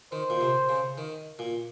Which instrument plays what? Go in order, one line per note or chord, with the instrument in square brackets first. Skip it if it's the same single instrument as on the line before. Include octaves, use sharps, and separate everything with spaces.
[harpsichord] D#3 [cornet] C5
[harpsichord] A#2
C3
C#3
D#3
A#2